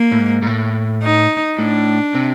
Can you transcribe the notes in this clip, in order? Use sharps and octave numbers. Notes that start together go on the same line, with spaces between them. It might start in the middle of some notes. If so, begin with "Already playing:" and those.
Already playing: A#3
A2
G#2
G#2
A2
D#4
A2 D4
C3